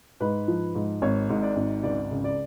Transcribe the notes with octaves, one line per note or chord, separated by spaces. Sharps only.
G#2 B4
F3
G#2
G#1 C#5
G#2
D5
G#1
C#2 D5
C#3
D5